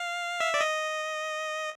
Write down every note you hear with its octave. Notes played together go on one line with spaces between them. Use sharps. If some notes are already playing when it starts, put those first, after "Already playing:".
Already playing: F5
E5
D5
D#5